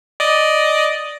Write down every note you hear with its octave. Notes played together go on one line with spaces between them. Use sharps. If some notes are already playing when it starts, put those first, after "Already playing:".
D5 D#5